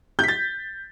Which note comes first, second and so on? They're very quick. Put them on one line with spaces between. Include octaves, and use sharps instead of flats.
G6 B6 A6